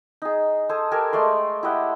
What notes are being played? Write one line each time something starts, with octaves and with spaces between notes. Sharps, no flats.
D#4 G#4
A4 C5 G#5 D#6
G4 A4 A#4 G#5
G#3 A3 D5 C6
E4 G4 D#5 F#5